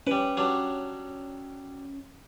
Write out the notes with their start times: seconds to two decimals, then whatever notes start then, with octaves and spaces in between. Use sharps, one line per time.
0.07 G3 C#4 B4
0.37 F#3 G3 D4